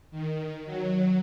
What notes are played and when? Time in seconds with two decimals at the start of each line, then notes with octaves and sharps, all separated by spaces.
0.11 D#3
0.65 F#3